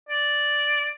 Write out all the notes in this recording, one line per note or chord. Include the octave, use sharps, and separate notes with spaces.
D5